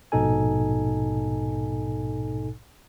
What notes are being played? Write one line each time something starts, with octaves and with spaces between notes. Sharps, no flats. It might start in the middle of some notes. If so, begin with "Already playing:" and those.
A#1 G#2 B2 D#4 A4 G#5